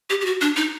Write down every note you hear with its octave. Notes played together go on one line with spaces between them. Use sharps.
G4
G4
F#4
D4
D#4